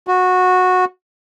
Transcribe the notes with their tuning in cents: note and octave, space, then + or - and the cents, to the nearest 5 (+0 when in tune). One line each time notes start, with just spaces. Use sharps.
F#4 -15